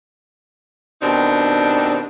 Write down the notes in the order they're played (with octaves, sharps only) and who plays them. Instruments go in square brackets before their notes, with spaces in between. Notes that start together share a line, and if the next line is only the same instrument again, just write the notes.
[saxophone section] B2 D#3 C4 D4 D#4 G4